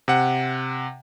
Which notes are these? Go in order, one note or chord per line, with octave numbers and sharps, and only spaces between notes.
C3 F#5